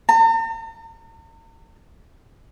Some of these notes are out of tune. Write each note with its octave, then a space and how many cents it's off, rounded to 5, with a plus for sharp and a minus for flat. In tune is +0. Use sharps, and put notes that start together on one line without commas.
A#5 -45